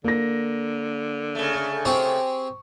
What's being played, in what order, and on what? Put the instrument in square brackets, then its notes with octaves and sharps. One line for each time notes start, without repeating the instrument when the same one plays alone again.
[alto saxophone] D3 [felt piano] A#3 A#6
[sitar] C#3 A3
[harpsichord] C4 G4 G#4 [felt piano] C#6